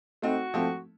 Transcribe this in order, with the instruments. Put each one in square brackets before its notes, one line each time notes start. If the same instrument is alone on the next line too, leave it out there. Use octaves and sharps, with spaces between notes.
[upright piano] A3 C4 D#4 [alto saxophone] F#4
[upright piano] F3 A3 C4